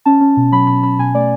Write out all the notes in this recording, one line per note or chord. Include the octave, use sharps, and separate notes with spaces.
C#4 A5
C#4
B2
F#3 B5
B2 B5
C#4 B5
B2 G#5
A3 D5